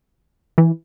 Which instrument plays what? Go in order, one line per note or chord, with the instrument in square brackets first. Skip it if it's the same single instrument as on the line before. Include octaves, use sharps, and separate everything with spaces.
[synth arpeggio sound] E3